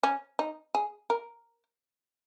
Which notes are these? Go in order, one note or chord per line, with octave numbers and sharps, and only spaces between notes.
C#4
D#4
G#4
A#4